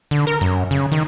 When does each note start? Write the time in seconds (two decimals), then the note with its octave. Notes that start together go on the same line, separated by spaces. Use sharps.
0.11 D3
0.27 A#4
0.41 F#2
0.71 C#3
0.92 D#3